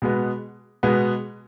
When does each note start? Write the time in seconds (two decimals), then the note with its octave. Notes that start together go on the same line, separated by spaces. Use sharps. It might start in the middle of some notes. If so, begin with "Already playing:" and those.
0.02 B2 G#3 B3
0.83 B2 G#3 B3